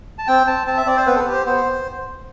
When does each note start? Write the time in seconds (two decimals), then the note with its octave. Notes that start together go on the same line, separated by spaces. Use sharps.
0.18 A5
0.27 C4 G5
0.47 C4 A5
0.67 C4 A5
0.77 E5
0.86 C4 D5
0.97 C5
1.06 B3 B4
1.15 A4
1.20 B4
1.26 G4
1.33 C5
1.46 B3 C5